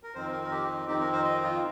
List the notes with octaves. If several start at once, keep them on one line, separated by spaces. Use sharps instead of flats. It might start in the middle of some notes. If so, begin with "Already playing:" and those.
A#4
F2 D#3 C4 D#4 C5
A#4
A#4
G4
F2 D#3 C4 D#4 G4
A#4
C5
D#5
F4